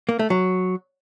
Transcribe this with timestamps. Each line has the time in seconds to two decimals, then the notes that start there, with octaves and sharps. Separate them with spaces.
0.09 A#3
0.19 A3
0.30 F#3